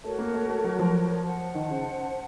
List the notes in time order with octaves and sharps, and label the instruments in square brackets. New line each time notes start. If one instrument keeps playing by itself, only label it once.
[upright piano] A3 [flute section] F#4 A#4 C#5 A5
[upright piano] A#3
A3
A3
F#3
F3
[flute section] C5 F#5 A5
[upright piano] D#3
C#3